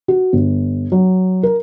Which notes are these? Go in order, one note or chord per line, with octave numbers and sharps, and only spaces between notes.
F#4
G1
F#3
A#4